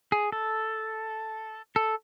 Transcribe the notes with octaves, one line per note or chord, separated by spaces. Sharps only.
G#4
A4
A4